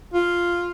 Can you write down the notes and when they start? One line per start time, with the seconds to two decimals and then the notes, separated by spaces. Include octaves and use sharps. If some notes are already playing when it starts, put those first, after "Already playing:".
0.14 F4